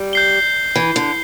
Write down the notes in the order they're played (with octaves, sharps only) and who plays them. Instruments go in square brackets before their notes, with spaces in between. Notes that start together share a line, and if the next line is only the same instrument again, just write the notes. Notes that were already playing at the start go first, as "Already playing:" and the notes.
Already playing: [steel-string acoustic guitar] G3
[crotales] G6 C7 G7
[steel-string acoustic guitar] E3
D3